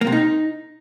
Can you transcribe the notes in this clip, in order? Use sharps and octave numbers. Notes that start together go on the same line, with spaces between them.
A#3
C3
D#4